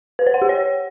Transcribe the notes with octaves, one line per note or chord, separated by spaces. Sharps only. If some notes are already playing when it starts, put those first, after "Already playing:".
B4
C5
F#5
G4
C#5